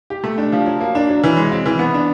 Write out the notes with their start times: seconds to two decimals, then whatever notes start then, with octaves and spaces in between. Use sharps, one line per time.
0.10 G4
0.24 A3
0.38 D4
0.52 F3
0.66 F#3
0.80 A#3
0.95 D4
1.09 F#3
1.23 E3
1.37 G#3
1.52 C4
1.66 E3
1.79 B3
1.94 D4